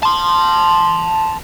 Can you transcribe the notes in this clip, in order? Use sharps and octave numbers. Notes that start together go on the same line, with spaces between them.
A5 C6